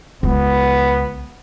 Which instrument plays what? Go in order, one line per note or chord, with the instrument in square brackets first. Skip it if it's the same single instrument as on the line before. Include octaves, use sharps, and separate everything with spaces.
[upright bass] C#2 [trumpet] B3